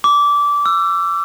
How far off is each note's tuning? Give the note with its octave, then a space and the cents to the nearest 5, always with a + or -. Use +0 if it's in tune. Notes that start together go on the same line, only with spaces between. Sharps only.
D6 -20
E6 +25